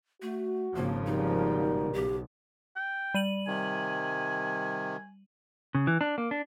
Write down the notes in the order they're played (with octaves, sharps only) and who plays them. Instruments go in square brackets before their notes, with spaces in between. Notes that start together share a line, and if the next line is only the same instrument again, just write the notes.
[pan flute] A3 [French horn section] F#4
[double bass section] G#1 C#3 F3 [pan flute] A#3
[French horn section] B2 G3 A#4 [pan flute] D#4
[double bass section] B1 [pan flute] G4
[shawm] G5
[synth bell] G3 D#7 F#7
[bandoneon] C3 D#3 [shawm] G#5
[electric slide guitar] C#3
E3
D4
A#3
D4